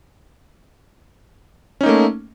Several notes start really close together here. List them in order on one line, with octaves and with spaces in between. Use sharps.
C#4 D#4 A#3 A3